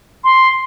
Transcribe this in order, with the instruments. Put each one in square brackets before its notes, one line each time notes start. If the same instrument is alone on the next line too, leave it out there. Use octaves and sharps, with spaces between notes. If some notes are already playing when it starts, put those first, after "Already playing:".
[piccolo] C6